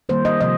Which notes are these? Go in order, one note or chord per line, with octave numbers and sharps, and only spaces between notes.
D#3 G3 A#3 C5
D#5
C3 F3 D#5